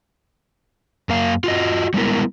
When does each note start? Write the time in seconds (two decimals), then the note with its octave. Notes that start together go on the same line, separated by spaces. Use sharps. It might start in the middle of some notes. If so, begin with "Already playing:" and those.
1.09 F#2 A#3 F5
1.44 F4 F#4 D#5
1.94 G3 G#3 B3 E4 A#4